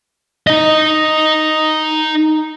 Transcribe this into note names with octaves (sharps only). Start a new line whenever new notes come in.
D#4 D#5